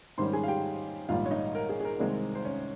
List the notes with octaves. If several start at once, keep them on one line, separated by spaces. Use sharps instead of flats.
G#2 D#3 G3 C#4 C5 C6
G#4 G#5
F5
G4 G5
A#1 G#2 D#3 G3 F4 F5
C#5
D#4 D#5
A#4
G#4
G#4
A#4
C2 C3 D#3 G#3 C4
C5
C#4 C#5